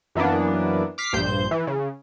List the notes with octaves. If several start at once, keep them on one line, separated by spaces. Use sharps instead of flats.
F#2 E3 A#3 B3 D4
D6 F6 B6 C7
A#1 G2 C5 G6
E3
C#3